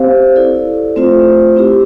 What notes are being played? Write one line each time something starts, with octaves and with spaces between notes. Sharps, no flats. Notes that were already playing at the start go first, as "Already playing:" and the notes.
Already playing: C4 G4 C5 F5
E4 A4 D5
A3 C4 F4 C5
C4 E4 G4